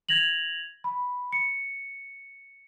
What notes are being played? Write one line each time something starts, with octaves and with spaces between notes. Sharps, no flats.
G#6 A#6 F7 F#7
B5
C#7